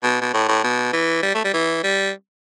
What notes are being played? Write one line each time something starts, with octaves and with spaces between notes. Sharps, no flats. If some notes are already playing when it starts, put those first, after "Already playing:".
B2
B2
A2
A2
B2
E3
G3
A3
G3
E3
G3